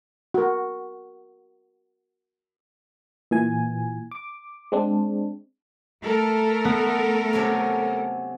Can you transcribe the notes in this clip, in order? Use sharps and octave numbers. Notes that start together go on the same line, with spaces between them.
F#4 A#4
A#2 E3 G#5
D6
G#3 C4 D4
A3 A4 A#4
B3
C3 F#3 C#4